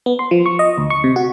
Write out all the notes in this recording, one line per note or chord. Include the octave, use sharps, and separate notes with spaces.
B3
C6
F3
C#6
D#5
D2
C#6
C3
F#4